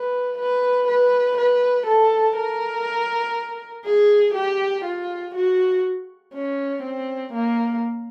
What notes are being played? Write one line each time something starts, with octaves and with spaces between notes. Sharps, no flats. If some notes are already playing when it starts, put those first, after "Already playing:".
Already playing: B4
B4
B4
B4
A4
A#4
G#4
G4
F4
F#4
C#4
C4
A#3